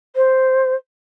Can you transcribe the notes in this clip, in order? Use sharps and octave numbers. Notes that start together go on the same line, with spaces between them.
C5